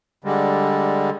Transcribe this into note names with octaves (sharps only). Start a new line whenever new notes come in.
D3 G3 G#3